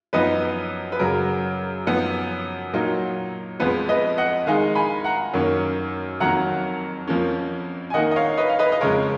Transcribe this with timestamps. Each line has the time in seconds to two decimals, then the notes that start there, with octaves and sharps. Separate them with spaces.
0.13 F#2 F3 B3 D#4 B4 D#5
0.92 B4
0.99 F#2 C#3 F#3 A#4
1.87 F#2 F3 B3 D#4
2.73 A#2 F#3 A#3 D#4
3.60 F2 F3 G#3 B3 B4
3.89 B4 D#5
4.18 D#5 F#5
4.46 D#3 G#3 D#4 F5 G#5
4.75 G#5 B5
5.04 F#5 A#5
5.33 F#2 D#3 A#3 C#4
6.20 F2 D#3 F#3 A#3 F#5 A#5
7.07 F2 F3 A#3 C#4
7.90 G#5
7.94 D#3 A#3 D#4 D#5 F#5
8.11 D#5
8.16 C#5 F5
8.37 B4 D#5
8.49 F5
8.59 B4 D#5
8.72 D#5
8.81 F2 C#3 G#3 A#4 C#5